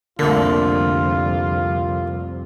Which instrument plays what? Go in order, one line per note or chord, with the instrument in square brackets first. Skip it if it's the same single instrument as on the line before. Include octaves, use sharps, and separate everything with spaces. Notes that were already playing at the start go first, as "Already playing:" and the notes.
[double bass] C2 F2 [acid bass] D3 [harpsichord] A3 A#3 [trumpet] F4